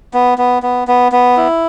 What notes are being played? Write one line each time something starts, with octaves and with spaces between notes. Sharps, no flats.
B3
B3
B3
B3
B3
E4